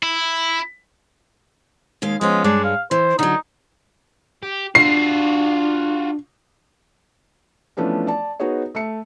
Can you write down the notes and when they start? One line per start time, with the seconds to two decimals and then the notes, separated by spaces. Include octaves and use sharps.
0.03 E4
2.02 D#2 G#3 F5
2.21 F3 G#3 B3 C#4
2.44 G2 G#3 D4 C#5
2.64 F5
2.91 E3 C5
3.19 D3 F#3 D#4
4.43 G4
4.75 D4 F4 F#4 C7
7.77 E3 F3 A3 B3 C#4 D4
8.07 D5 A5
8.40 B3 D#4 F#4 G#4 C#5
8.75 A3 E5 C#7